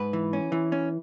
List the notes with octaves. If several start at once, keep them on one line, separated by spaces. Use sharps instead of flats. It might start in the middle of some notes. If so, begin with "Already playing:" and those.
Already playing: G#2 B4
E3
C#4
E3
C#4